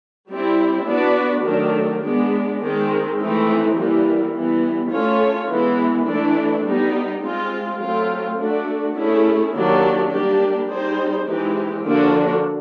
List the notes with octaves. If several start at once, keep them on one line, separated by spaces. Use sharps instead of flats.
G3 C4 E4
B3 D4 F#4 B4 D5
D#3 F#3 A3 D4
G#3 B3 D4
D#3 G#3 C4
E3 A3 C4 D#4
E3 G3 A#3
E3 G3 B3
A3 C#4 F4 A4 C#5
E3 G#3 B3
E3 A3 D4
G3 B3 D#4
G#3 C4 F4
F#3 A3 C4 F4
A3 D4 F#4
A3 C#4 E4 G#4
D#3 F#3 A#3 D4 G4
G3 A#3 D4 G4
G3 C4 D#4 G#4 C5
E3 G#3 C4 D#4 G4
D3 F3 A#3 D4 F#4